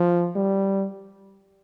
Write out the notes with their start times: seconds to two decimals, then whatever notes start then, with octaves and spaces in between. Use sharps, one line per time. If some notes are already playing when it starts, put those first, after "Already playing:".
Already playing: F3
0.36 G3